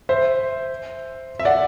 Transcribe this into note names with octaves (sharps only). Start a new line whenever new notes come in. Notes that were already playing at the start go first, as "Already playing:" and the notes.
C5 E5
E5
D5 F#5